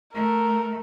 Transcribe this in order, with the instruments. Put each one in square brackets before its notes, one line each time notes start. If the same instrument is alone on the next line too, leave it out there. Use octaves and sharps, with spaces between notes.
[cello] A3 [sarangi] A#4